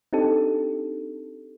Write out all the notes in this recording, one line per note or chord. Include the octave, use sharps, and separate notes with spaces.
C4 D4 D#4 G4 A4